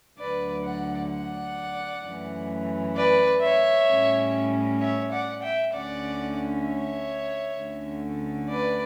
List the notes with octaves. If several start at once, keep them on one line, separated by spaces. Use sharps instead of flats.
D2 D3 F#3 B4 D5
D5 F#5
D5 F#5
F#2 E3 A3 C#4
B4 D5
C#5 E5
A2 G3 C#4
C#5 E5
D5 F#5
E5 G5
D2 D3 A3 C#4 D5 F#5
C#5 E5
D2 D3 A3 C#4
B4 D5